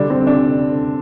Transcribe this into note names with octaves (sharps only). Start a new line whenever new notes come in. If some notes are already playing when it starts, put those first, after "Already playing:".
Already playing: D3 G3 D4
C4
D4